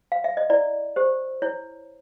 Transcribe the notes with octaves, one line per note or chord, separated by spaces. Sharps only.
F5
E5
D#5
E4 D5
G4 C5
E4 C#5